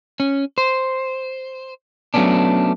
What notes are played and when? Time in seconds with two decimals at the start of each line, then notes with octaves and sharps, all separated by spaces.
0.20 C#4
0.58 C5
2.14 F#3 A3 B3 C#4 D4